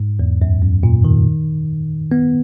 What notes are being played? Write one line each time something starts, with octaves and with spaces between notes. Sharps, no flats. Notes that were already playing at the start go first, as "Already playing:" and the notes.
Already playing: G#2
E2
F#2
F#2
A#2
D#3
B3